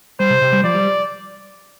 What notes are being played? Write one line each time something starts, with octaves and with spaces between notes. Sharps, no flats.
G3 C5
C3
C3
G3
F3 D5
G3